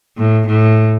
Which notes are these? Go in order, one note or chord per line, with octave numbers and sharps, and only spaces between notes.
A2
A2